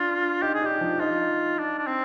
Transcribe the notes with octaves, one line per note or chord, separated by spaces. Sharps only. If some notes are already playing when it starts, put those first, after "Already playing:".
Already playing: D4 F4
D#4 G4
G#4
D4 G4
F3
D#4 F4
D4
D4
C4